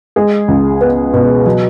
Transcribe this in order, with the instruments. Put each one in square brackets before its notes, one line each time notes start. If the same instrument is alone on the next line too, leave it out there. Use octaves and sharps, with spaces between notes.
[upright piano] G#3 G#4
C#2
B3
B2
F#3